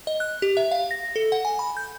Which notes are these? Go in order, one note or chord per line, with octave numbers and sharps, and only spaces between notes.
D#5
F#6
G4
E5
F5
A#6
A4
F#5
G#5
B5
G6